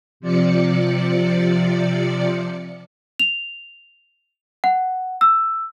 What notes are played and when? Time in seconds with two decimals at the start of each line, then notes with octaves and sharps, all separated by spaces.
0.20 C3 F3 D5 C#7
3.19 F7
4.64 F#5
5.21 E6